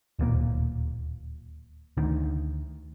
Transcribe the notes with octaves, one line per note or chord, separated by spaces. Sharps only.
D1 D#2 A#2 A#3
D2 D#3